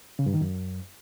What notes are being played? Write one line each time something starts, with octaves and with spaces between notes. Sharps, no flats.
C#3
G2
D#3
F#2